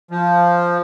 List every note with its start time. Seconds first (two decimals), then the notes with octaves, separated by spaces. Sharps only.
0.11 F3